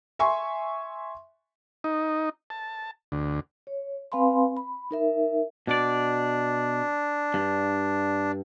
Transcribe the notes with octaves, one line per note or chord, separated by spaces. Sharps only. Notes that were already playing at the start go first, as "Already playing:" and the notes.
E5 G#5 C6 C#6
D#4
A5
D2
C#5
C4 B4 F5 G#5 B5 C6
B5
D#4 A#4 E5
B2 D4 D5
G2